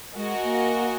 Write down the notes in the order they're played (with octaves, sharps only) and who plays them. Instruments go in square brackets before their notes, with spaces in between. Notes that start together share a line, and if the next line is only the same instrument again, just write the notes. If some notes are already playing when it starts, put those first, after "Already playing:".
[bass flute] G#3 [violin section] F#4 A#4 D#5 G#5
[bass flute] A#3